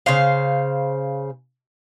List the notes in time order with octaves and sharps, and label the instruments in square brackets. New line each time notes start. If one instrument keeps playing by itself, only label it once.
[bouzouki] C#3 C5 F5